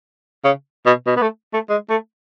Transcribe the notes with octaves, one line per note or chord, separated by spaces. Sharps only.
C#3
B2
B2
B3
A3
A3
G#3
A3